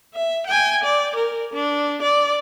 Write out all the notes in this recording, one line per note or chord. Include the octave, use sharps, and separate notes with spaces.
E5
G5 G#5
D5
A#4
D4
D5